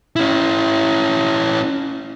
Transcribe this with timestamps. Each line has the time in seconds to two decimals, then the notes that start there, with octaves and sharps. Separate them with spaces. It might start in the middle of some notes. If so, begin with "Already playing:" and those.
0.16 C#4 E4